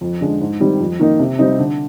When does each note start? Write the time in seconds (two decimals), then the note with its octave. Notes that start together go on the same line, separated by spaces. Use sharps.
0.01 F2
0.21 D3 G#3 D4
0.41 G#2
0.60 D#3 G3 C4
0.80 F2
0.99 D#3 A#3 D#4
1.19 C3
1.39 G3 C4 D#4
1.59 D3